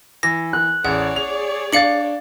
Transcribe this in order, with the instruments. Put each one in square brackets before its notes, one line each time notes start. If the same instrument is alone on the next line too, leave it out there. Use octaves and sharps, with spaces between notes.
[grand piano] E3 [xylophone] A#6
[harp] F#6
[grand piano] A1 [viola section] G#4 C#5 D5 [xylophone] F#5
[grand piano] F7
[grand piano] D4 A6 [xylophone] F5 C#7 F#7